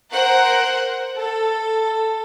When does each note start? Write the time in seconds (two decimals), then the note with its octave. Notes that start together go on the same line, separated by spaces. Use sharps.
0.13 A#4 C5 F#5
1.17 A4